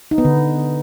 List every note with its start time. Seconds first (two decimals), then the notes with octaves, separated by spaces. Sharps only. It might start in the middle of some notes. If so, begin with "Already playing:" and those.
0.11 D#4
0.18 B3
0.25 D3